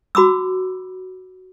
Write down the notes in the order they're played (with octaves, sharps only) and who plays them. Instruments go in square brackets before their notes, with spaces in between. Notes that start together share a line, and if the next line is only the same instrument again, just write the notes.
[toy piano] F#4 B5 D6 E6